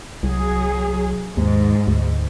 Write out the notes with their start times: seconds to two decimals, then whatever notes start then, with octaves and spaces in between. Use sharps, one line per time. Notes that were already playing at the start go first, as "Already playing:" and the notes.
0.23 C2 F#3 G#4
1.37 D#2 G#2
1.87 D2